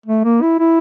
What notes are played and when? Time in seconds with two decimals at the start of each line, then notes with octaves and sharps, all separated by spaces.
0.06 A3
0.24 A#3
0.42 E4
0.60 E4